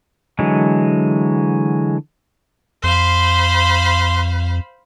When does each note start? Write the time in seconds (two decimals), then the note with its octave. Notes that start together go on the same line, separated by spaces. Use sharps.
0.39 D3 E3 F#3 G#3
2.84 F2 C5 F5 B5 C6